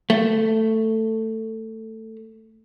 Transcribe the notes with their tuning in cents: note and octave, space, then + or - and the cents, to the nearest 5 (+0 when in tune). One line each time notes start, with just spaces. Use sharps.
A3 +10